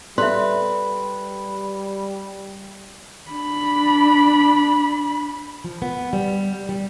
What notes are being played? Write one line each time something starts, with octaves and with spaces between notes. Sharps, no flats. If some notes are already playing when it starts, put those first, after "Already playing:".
G3 A4 B4 D5 E5 A#5 C6
D4 B5
F3
B3
G3
G3